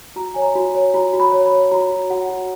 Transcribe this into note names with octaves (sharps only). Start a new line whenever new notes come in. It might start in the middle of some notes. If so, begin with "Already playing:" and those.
F#4 A#5
C#5 G#5
A#5
F#4
C#5
F#4 A#5
F#4
B5
C#5
B5
C#5
F#4 A#5
F#4
F#4 F#5
F#4